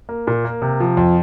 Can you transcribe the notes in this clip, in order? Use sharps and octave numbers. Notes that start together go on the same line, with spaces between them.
A#3
A#2
A#3
C3
F3
F2